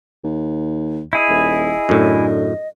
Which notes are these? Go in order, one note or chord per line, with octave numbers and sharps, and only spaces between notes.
D#2
E4 G#4 D#5
D#1
F#2 A2 D3